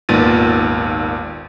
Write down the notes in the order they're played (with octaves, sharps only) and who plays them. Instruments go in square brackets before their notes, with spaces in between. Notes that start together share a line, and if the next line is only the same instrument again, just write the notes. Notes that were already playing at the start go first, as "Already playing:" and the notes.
[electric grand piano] G#1 D#2 A#2 B3 A6 D#7